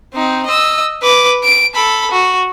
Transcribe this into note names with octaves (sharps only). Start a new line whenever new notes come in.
C4 D#4
D#5 E6
B4 D6
D7
A4 B5
F#4